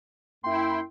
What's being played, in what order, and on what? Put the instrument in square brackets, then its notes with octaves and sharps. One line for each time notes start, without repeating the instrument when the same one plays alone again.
[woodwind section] F#2 A#3 C6 [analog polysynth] E4 G5